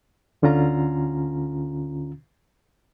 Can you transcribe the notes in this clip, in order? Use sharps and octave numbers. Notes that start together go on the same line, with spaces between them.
D2 D3 C#4 F4 A#5